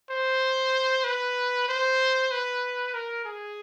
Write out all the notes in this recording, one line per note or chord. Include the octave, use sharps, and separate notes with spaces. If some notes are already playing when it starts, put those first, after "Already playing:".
C5
B4
C5
B4
A#4
G#4